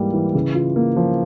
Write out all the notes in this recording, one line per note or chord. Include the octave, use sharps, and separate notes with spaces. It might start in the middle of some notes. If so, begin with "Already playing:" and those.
Already playing: G#2 E3 G3 A#3
E3
C#3
F4
A#3
F3